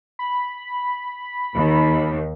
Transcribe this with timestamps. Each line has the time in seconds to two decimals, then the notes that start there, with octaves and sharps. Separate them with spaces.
0.19 B5
1.55 D#2